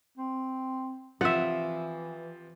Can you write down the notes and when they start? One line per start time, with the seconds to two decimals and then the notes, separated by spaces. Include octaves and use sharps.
0.18 C4
1.21 C3 E3 F3 E5 F#5